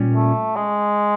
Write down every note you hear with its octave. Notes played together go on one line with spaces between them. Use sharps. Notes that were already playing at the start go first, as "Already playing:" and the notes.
Already playing: A#2 G3 A#3 C#4
A3
G#3